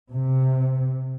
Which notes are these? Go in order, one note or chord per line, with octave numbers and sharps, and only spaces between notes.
C3